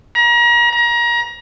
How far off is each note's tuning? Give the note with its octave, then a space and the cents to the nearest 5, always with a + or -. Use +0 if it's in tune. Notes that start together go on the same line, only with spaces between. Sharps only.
A#5 +35
A#5 +30